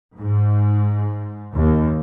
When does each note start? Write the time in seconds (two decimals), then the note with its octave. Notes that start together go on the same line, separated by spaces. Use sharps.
0.17 G#2
1.55 D#2